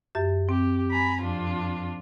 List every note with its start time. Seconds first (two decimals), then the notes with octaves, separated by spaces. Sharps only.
0.15 F#2 G4 E5
0.49 C4 G4
0.90 G#5 A#5 B5
1.22 F2 D4 F4